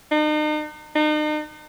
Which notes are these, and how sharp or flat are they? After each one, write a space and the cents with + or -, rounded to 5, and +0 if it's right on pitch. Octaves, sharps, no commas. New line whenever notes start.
D#4 -40
D#4 -40